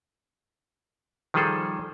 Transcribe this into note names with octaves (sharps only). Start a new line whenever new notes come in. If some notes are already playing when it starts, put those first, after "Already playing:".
D#3 F3 G3 G#4 A4 C5